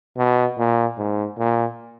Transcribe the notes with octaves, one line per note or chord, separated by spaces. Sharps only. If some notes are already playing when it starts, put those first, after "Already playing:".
B2
A#2
G#2
A#2